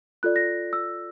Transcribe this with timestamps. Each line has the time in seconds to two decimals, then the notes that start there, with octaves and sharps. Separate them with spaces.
0.23 F4 A4 D5 F#6
0.36 A#6
0.73 E6